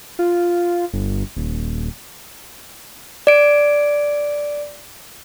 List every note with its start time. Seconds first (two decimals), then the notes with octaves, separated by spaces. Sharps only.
0.19 F4
0.93 G1
1.36 D#1
3.27 D5 D7